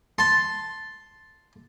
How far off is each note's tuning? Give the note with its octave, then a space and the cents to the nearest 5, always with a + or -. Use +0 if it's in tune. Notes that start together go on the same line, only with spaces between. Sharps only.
A5 +0 C6 +0